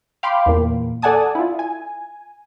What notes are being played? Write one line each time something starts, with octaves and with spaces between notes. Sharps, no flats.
F5 G5 B5 C6 D6
E2 A#2 A#3
A4 D5 F#5 G#5 A5 D#6
E4 F4
G#5